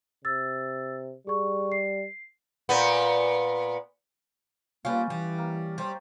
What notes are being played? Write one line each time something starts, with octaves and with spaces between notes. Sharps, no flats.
C3 E6 A6
G3 G#4 C#6
C7
A#2 B3
G3 A#3 C#4 F4 B4
E3 G3
A#3
G3 G4 C5 C#6